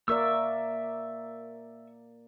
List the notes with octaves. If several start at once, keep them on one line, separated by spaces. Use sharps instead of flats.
A#3 A#4 D5 E5 C#6 E6